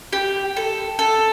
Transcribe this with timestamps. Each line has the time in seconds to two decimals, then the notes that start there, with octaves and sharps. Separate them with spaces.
0.13 G4
0.56 A4
0.99 A4